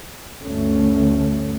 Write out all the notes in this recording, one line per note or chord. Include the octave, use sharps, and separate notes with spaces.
D2 G2 A3 C#4